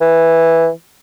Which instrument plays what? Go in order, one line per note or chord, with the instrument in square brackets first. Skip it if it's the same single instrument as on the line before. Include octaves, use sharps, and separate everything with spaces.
[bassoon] E3